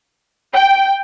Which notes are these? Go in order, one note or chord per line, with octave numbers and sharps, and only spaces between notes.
G5